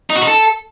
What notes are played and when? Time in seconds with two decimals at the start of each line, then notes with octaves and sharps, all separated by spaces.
0.10 D#4
0.16 F#4
0.21 D#4
0.27 A4